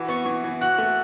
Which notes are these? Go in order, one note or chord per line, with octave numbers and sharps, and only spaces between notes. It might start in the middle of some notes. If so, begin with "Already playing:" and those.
Already playing: E3 F#4
B3 C#6
E3
E3
F#4 F#6
A3